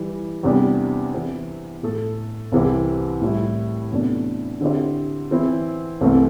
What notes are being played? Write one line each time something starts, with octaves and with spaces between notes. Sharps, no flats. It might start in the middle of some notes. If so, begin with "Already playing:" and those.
Already playing: E3 G3
E2 C3 G3 D4 G4
E3 C4 E4
A2 A3 E4 A4
C2 C3 E3 C4 G4
A2 G3 E4
E2 C3 A3 D4
D3 C4 E4 G4 C5
E3 C4 E4
C2 C3 E3 A3 C4